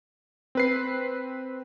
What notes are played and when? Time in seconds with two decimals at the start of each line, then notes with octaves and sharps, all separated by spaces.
0.55 C4 B4 C7